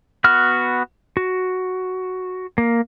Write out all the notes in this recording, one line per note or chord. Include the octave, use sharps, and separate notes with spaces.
B3 F#4 F6
F#4
A#3